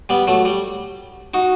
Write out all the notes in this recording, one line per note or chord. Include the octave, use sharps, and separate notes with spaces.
G3 B3
F#3 A3
G3
D#4 F#4